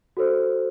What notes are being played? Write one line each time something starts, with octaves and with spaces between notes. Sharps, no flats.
F#4 A4 C5